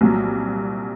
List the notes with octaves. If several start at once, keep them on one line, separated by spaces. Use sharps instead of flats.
C2 A#2 F#3